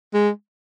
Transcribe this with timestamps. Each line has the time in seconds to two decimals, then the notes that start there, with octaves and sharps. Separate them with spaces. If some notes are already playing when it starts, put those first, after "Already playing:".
0.14 G#3